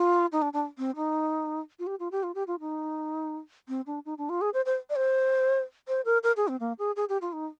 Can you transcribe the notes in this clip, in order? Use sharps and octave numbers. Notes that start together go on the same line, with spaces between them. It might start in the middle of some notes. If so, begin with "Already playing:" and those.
Already playing: F4
D#4
D4
D4
C4
D#4
F4
G4
F4
G4
F4
G4
F4
D#4
C4
D4
D#4
D4
F4
G#4
C5
C5
D5
C5
C5
A#4
A#4
G#4
C4
A#3
G#4
G#4
G4
F4
D#4